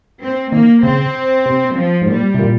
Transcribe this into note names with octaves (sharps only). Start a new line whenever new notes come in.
C4
D#3 A#3
C#3 C4
C3
F3
G#2
A#2 G3
C3
A#2